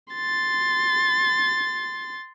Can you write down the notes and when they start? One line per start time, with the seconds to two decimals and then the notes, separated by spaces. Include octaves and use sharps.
0.14 C6 A6